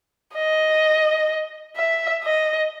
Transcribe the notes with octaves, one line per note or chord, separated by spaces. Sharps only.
D#5
E5
D#5